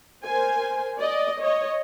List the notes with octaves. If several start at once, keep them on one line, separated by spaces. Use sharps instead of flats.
A#4 C5 G#5
D5 D#5
C#5 D#5